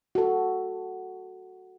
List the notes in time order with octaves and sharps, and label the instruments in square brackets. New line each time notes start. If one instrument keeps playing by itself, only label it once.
[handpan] F#4 A4